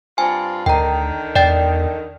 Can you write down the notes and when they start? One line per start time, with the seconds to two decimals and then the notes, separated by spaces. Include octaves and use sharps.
0.18 G2 C4 F4 G#5
0.66 D2 D3 D#3 G5 A#5
1.35 E2 D5 G5 A6